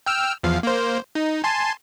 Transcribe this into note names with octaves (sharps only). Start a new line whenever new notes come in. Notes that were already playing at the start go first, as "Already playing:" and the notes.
G5 E6 F6
E2 F3 F5
A#3 C5
D#4
G#5 A5 C6